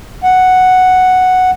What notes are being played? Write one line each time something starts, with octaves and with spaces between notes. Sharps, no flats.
F#5